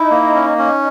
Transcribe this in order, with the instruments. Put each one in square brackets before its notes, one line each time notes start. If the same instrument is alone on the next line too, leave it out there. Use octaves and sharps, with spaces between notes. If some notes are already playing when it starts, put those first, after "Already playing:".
Already playing: [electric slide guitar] D#4 [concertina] E4
[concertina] A#3
C#4
C#4